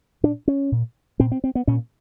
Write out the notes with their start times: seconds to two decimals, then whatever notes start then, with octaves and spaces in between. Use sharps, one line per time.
0.23 A#2 D4
0.48 C#4
0.72 A#2
1.20 A#2 C4
1.32 C4
1.44 C4
1.55 B3
1.67 A#2 C#4